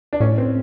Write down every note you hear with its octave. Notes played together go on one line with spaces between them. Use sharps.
D4
A2 C#4
C4